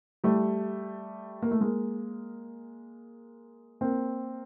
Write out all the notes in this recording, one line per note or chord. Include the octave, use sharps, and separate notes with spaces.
G3 A3
A#3
A3
G#3 A#3
A#3 C4